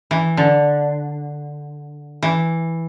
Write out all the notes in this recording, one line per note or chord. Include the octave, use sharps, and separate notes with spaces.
E3
D3
E3